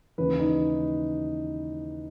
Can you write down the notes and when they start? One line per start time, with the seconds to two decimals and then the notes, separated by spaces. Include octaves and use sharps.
0.18 D#2 C#3 E3 B4
0.39 D#4